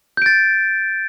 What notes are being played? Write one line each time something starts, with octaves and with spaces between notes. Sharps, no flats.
G6 A6 D7